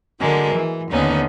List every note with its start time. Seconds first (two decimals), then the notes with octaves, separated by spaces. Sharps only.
0.20 D3 F#3 G#3 A#3
0.55 E3
0.90 D#2 D3 B3 C#4 D#4